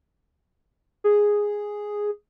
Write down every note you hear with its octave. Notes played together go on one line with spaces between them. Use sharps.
G#4